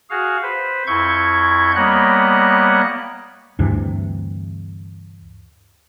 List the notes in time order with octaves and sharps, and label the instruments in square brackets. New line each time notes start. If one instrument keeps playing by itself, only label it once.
[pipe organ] F#4 G#4 F5
B4 C5
F2 E4 C#6 G6 G#6
G3 A#3 B3 C#5 D#5 F#6
[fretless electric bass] D2 G2 C3 E3